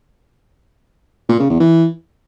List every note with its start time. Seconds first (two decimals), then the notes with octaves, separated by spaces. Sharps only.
1.29 A#2
1.39 C#3
1.50 E2
1.60 E3